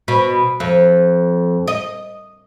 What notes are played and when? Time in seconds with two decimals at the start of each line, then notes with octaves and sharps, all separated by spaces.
0.08 B2
0.60 F2
1.68 D#5